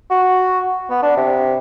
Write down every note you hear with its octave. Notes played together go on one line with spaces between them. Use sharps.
F#4
B3
D4
C3